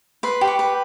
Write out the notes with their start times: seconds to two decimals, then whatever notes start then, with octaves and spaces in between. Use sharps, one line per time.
0.23 B4 C6
0.41 G4
0.48 C#6
0.59 B4